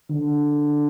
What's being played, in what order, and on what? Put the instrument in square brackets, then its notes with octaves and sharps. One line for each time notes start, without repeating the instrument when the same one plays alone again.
[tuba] D3